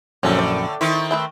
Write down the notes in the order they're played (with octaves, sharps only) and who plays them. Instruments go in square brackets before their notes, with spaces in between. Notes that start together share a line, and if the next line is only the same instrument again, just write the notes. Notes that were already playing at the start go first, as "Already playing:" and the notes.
[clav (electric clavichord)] A#1 F#2 [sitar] A2 D3 [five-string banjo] C#4 A4
[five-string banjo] D5
[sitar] D#3 C4 [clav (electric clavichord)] E4
[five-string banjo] A3 B4 E5